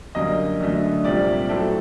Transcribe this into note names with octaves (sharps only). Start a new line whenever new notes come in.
F#2 D3 G3 A#3 D#5
F#2 D3 A3
C2 A#2 G3 C4 D5
A2 F#3 A3 C4 A4